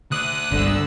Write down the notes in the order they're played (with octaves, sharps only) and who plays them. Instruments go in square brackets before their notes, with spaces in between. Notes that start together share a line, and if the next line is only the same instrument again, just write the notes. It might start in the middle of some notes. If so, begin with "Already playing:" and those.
[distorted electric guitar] D2 D5 [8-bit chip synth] D#6 F#6
[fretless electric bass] G1 [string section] C2 D3 E6